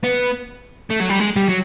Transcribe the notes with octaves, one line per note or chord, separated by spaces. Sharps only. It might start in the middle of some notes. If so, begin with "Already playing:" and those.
B3
A3
F#3
G3
G#3
G3
F#3